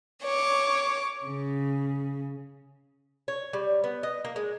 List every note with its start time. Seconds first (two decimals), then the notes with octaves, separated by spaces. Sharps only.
0.23 C#5 D6
1.25 C#3
3.28 C#5
3.53 G3
3.84 B3
4.03 D#5
4.25 A#3
4.36 G#3